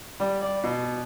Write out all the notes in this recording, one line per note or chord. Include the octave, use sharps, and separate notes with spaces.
G3
D5
B2